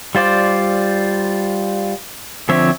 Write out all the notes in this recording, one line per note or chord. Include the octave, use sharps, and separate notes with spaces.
G3 F4 C5 D5
D3 F3 C4 C#5 E5